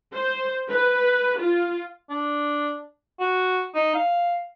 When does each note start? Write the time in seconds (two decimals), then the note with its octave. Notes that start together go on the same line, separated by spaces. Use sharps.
0.14 C5
0.69 B4
1.38 F4
2.10 D4
3.20 F#4
3.75 D#4
3.95 F5